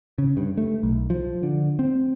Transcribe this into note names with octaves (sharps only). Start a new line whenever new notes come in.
C#3
G2
A3
B1
F3
D3
C4